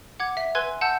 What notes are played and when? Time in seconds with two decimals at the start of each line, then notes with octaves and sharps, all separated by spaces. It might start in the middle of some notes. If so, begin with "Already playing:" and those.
0.20 F#5 D6 G#6
0.37 E5 B6
0.55 B4 G#5 C6 E6 F#6 G#6
0.81 F#5 A5 E6 G6